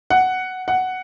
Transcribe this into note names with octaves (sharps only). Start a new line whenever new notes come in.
F#5
F#5